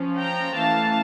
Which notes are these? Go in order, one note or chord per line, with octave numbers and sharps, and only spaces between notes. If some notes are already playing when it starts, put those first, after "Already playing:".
Already playing: F3 C#4
G5 A#5
E3 A3 C#4 F5 A5